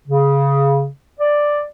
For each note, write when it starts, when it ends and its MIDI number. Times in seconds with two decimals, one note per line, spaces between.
0.08 0.88 49
1.20 1.61 74